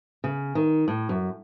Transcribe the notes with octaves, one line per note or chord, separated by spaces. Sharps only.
C#3
D#3
A2
F#2